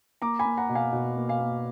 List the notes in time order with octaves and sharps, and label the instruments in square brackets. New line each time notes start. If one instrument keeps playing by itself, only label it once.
[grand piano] A#3 A#5 D6
G#5 B5
A#3
F#5 A#5
B2
F5 G#5
B2 F#5
A#3
F5 G#5
A#3